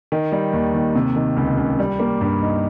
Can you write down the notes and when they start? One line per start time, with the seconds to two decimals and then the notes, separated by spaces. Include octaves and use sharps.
0.12 D#3
0.32 G3
0.53 D#2
0.75 D#2
0.95 C3
1.16 D#3
1.37 C#2
1.58 C#2
1.79 G3
2.00 A#3
2.21 G2
2.42 D#4